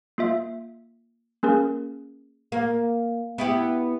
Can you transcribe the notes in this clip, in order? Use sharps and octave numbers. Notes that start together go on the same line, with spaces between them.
A#3 F4 E5
A#3 C#4 G#4 A#4
A#3
B3 E4 G4